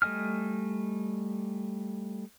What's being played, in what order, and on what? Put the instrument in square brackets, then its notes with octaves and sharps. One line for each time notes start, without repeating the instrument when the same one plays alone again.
[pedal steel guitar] G3 A3 D#5 G#5 F6